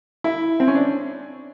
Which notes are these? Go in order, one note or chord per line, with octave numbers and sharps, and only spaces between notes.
E4
C4
C#4
D4